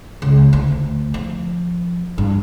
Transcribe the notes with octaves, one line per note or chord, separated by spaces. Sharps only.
C#2
D2
F3
G2